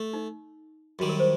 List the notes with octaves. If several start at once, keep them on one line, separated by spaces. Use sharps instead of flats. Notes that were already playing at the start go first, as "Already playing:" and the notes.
Already playing: A3
D#4
F#2 D#3 G3 F#4
A#4
C5